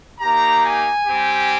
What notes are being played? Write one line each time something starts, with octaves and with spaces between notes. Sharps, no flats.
A#3 D#4 G4 A#5
G#5
G3 C4 G4